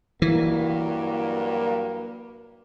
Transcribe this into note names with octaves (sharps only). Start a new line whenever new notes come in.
G2 E3 F#3 A#3